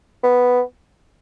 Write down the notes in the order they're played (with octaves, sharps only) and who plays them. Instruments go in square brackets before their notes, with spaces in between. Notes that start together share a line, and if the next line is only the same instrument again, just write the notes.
[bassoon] B3